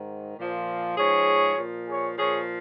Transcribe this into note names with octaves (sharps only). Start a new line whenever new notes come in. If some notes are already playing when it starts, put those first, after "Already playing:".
Already playing: G#2 D#3
A#2 F3
G#2 F3 G#4 C#5
A#2 F3
G#4 C#5
A#2 F3 G#4 C#5